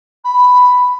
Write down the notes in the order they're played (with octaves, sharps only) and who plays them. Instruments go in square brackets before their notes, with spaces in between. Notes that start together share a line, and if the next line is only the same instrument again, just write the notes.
[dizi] B5